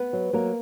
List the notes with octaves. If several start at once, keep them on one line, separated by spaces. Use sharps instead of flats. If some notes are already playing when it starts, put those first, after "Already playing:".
Already playing: B3 B4
F#3
F#3 A#3 A#4